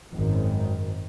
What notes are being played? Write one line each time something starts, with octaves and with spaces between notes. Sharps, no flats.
G#1 F#2 D#3